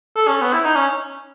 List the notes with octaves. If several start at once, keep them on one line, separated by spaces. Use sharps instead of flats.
A4
C#4
B3
E4
D#4
C#4